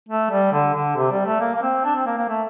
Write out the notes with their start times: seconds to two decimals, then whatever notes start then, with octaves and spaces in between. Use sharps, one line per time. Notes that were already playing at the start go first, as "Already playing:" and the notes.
0.09 A3
0.31 G3
0.53 D3
0.75 D3
0.96 C3
1.11 G3
1.26 A3
1.40 A#3
1.55 A#3
1.62 C4
1.85 D4
1.95 C4
2.06 A#3
2.17 A#3
2.29 A3